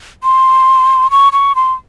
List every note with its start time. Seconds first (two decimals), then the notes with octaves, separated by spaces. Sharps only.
0.24 C6
1.11 C#6
1.33 C#6
1.55 C6